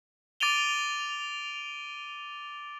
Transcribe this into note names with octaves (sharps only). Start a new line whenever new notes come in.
D6 A6 D7 D#7 F7 G7